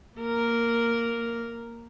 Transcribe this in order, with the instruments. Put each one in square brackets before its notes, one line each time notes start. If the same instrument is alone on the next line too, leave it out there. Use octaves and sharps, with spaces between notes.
[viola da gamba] A#3 A#4